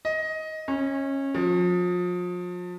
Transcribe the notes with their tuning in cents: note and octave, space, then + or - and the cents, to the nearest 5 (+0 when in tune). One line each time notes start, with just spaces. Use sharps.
D#5 +15
C#4 -20
F3 +35